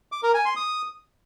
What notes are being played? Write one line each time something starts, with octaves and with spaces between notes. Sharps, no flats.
D6
A#4
G#5
C6
D#6